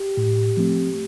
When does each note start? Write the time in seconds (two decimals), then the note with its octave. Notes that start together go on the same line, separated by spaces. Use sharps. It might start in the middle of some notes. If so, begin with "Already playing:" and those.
Already playing: G4
0.17 A2
0.57 F3 A3 C4